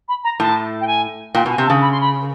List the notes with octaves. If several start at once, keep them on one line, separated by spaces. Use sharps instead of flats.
B5
A#5
A2 A5
G5
G#5
A#2 G5
B2
G#5
C3
A5
C#3
B5
C6
B5